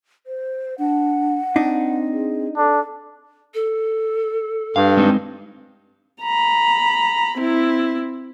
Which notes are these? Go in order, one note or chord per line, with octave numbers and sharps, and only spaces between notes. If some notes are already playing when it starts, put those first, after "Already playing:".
C5
D4 F#5
C4 D4 D#4
G#4
D4 A4
A4
G2 F5
G#3 C4 D#4
A#5 B5
C4 E4